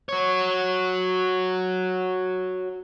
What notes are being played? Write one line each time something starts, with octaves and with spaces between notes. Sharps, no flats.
F#4 C#5